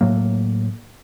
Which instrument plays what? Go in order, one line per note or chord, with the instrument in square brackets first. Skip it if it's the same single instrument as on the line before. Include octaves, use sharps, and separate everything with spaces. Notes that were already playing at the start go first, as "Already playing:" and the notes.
[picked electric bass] A2 F#3 A#3